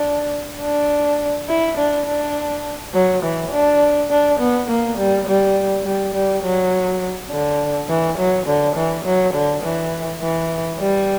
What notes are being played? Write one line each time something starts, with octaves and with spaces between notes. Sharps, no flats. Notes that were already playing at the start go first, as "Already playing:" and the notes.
Already playing: D4
D4
E4
D4
D4
F#3
E3
D4
D4
B3
A#3
G3
G3
G3
G3
F#3
D3
E3
F#3
D3
E3
F#3
D3
E3
E3
G3